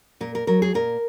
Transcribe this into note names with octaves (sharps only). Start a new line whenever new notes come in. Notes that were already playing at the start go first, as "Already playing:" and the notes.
A#2 A#4
A#4
F#3 A#4
G#4
A#2 A#4